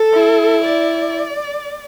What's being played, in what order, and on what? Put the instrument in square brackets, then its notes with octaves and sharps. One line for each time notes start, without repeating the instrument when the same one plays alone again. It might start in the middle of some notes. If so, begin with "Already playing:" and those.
Already playing: [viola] A4
[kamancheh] E4
[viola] D5